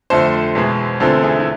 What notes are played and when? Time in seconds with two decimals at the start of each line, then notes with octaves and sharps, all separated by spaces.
0.10 F2 D3 A3 A4 C5
0.55 E2 B2 G#3
1.00 E2 D3 A3 C4 F4 A4
1.23 E4 G#4
1.39 E4